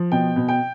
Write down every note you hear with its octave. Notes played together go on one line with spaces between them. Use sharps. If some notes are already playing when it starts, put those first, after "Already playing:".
Already playing: F3
B2 G5
B2
G5